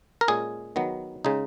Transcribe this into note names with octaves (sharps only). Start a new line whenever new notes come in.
A#4
A#2 G#3 C#4 G#4
D#3 F#3 B3
C#3 G#3 D#4